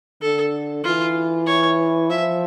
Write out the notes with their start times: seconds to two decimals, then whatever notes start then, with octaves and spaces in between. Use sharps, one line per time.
0.22 D3 A4
0.84 E3 F4
1.46 C#5
2.10 F3 E5